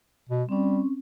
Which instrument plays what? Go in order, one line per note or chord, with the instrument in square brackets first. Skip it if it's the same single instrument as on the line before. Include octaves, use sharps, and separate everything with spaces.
[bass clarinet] B2
[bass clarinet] G3 [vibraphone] C4 C#4